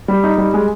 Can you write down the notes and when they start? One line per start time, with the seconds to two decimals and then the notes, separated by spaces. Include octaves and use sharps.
0.08 G3
0.24 D#4
0.38 G3
0.54 G#3